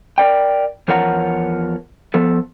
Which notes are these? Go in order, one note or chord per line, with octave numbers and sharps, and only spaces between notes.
A#4 D5 G5
E2 F3 A#4 C#5 F#5 A#5
F3 B3 A4